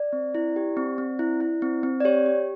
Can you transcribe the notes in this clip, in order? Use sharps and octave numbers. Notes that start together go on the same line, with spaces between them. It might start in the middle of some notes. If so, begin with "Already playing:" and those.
Already playing: D5
C4
E4
G4
C4
C4
E4
E4
C4
C4
D5
G4 C#5
G4